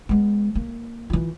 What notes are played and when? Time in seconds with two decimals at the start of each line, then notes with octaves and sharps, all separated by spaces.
0.09 G#3 B3
0.55 A#3
1.10 E3 F4